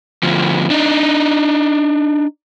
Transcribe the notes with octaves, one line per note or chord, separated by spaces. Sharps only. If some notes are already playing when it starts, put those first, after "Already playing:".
D2 F3
D4 D#4